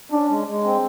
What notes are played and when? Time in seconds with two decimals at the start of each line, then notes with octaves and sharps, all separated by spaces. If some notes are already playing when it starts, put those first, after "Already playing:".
0.11 C#4 D4
0.29 G#3
0.47 G#3
0.64 C4